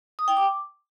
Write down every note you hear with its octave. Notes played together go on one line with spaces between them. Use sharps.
D#6
G5
D6